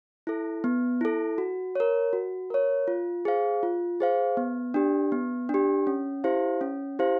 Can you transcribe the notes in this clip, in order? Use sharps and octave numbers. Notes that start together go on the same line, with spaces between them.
E4 A4
B3
E4 A4
F#4
A#4 C#5
F#4
A#4 C#5
F4
G#4 C5 F5
F4
G#4 C5 F5
B3
D4 G4
B3
D4
G4
C#4
E4 G4 C5 F5
C#4
E4 G4 C5 F5